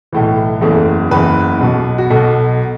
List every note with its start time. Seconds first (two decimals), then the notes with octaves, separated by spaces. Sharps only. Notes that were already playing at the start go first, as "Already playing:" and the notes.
0.12 B1 A2 E3
0.61 F#1 E2 E3 A3
1.11 F#1 E2 E3 B4
1.61 B1 B2
1.98 F#4
2.10 B1 B2 A4